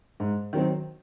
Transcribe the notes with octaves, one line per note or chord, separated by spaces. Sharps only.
G#2
D#3 F#3 C4